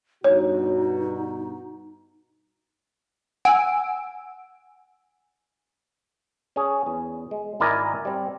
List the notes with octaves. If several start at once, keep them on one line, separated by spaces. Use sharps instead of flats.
G2 B2 D#4 F#4 C#5
F#5 G#5 E6 D7
C#4 G#4
E2
G#3
G#1 E4 A#4 D5 D#5 G#5
G3 C4